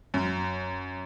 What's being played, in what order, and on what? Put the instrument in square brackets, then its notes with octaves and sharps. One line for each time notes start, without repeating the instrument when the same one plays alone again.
[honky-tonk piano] F#2